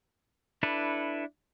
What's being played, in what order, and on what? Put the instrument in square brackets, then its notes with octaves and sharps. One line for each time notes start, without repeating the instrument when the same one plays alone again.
[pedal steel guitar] D4 E4 A4 B4